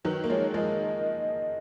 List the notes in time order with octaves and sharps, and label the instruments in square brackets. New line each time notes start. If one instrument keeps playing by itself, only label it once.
[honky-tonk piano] D#3 F#3 [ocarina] B4
[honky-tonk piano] A#3
[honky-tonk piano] F3 G#3 [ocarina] C#5
[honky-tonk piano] F3 G#3 [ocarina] D#5